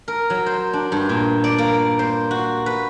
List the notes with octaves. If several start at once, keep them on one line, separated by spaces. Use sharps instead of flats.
A#4
F#3
C5
D4
G2
A#2
D5
A#3
C5
F#4
B4